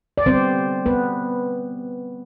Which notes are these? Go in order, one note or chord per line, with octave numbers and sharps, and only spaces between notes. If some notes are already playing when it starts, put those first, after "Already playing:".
D5
D3 G3 B3 C4 C5
B3 B4